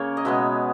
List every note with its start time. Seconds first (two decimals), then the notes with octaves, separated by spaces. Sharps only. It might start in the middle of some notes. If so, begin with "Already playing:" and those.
Already playing: C#3 A#3 C#5
0.17 D#5
0.25 B2 G#3 B3 E5